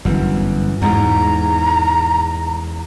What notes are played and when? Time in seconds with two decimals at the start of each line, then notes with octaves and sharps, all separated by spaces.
0.05 G1 F#2 E3
0.82 E2 G#2 A#5